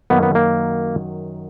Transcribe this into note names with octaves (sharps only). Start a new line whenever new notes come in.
F#2 D#3 F#3 A#3 B3
B3
A#3